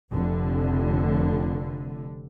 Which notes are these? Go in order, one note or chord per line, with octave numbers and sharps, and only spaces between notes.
F1 D3